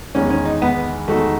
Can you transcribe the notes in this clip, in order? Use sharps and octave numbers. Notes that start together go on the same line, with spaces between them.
E2 D#3 G#3 C#4
C#4
D#4
B3
E2 D#3 G#3 A3 D#4 F#4